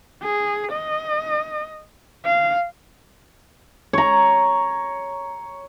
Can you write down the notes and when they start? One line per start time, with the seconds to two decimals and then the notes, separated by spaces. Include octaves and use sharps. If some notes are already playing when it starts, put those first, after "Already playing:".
0.23 G#4
0.73 D#5
2.26 F5
3.93 C#5 A#5